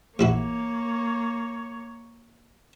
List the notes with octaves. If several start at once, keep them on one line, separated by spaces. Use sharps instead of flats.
A1 A#3 E4 F#4 C#5